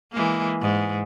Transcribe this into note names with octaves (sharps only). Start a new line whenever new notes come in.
E3 G#3 A#3
G#2